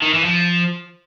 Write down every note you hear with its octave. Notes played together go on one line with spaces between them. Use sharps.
D#3
E3
F3